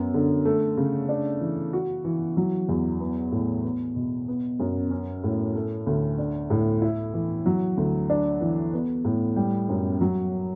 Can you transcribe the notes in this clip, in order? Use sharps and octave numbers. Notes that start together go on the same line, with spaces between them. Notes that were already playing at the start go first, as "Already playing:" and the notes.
Already playing: F#2 B3
D3
A3
C#3
D4
E3
F#4
E3
F#3
E2
B3
A2
B3
B2
B3
F#2
C#4
A2
A3
D2
D4
A2
E4
E3
F#3
D2
D4
E3
B3
A2
G3
F#2
F#3